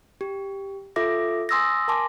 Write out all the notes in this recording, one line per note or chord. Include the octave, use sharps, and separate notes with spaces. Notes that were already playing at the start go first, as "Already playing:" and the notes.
G4
F4 A4 E5 D6 A#6
G#5 C6 D#6 E6 A6 A#6
A#4 G#5 A5 C6 D6 A#6